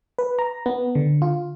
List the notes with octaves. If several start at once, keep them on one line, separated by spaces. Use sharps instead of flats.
B4
A#5
B3
D3
F4